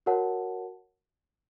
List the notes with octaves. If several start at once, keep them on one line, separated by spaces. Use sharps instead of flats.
F#4 A#4 C#5 F#5 A5